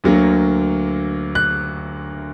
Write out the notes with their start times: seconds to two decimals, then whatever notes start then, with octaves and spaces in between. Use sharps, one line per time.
0.04 D2 D3 F#3 A#3
1.35 F#6